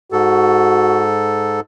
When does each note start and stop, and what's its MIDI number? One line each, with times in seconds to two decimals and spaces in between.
0.12 1.60 44
0.12 1.07 66
0.12 1.60 69